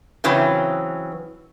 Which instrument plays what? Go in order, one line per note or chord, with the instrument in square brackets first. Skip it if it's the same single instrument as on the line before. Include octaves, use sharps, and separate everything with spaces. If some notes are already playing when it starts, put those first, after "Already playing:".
[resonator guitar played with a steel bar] C#3 E3 F#3 C4 C#4